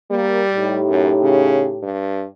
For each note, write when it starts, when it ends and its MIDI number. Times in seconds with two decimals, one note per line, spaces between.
0.11 0.80 55
0.11 0.40 58
0.52 1.89 45
0.52 1.89 63
0.52 1.89 67
0.89 1.12 42
1.22 1.69 49
1.83 2.26 43